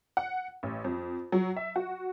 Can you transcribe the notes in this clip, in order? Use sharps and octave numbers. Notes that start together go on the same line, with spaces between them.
F#5
A1
F2
F#3
E5
F#4